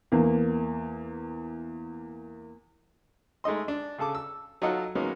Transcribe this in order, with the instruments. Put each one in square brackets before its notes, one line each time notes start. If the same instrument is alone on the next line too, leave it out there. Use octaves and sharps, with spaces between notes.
[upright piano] E2 A#3
[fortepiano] G#3 A3 D#4 D#5 C6
D4
C#3 G#4 A4 A5 D6
E6
F#3 D#4 F4 A4 D#5 F#5
F#3 G#3 A#3 B3 C#4 D#4